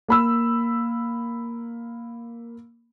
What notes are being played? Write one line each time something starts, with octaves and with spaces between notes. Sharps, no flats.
A#3 B5 E6